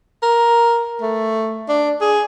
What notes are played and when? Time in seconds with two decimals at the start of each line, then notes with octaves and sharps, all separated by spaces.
0.23 A#4
1.01 A3
1.69 D4
2.01 G#4